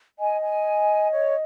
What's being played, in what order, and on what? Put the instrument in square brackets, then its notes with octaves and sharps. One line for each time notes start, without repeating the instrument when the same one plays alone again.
[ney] D#5 [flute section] G#5
[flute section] G#5
C#5